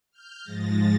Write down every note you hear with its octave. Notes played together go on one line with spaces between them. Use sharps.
F6 G6
G#2 F3 G#3 A6 A#6